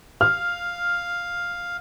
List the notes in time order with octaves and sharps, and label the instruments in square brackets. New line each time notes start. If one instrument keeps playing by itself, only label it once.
[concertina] F5 [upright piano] F6